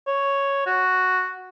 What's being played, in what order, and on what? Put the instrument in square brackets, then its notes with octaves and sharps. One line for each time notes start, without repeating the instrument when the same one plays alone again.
[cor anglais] C#5
F#4